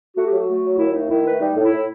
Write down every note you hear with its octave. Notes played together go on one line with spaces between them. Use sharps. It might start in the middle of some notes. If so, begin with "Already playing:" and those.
A3 F#4
F#3 G4
F#4
A3
F#3
D#2 E4
A3 D#4
D#3 E4
A3 B4
G3 D#4
A2
E4
A2